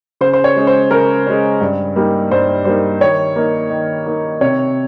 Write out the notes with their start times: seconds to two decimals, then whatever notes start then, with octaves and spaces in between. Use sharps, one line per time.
0.21 C#3 C5
0.33 C5
0.44 C#5
0.56 G#3 C#4
0.67 C5
0.91 C#3 A#4
1.27 G#3 C#4
1.61 G2
1.96 G3 A#3 D#4
2.31 G2 C5
2.65 G3 A#3 D#4 C5
3.01 D#3 C#5
3.36 A#3 D#4
3.70 D#3
4.06 A#3 D#4
4.41 C3 C#5